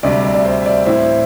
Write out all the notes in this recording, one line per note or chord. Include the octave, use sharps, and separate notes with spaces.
D2 C3 G3 D4 D5
D5
D5
C5
E5
D5
A2 E3 C4 E4 E5